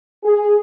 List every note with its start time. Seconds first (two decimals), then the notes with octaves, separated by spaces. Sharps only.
0.24 G#4